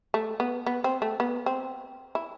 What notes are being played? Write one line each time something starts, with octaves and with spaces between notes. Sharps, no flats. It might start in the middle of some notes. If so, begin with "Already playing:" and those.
A3
B3
B3
C4
A3
B3
C4
E4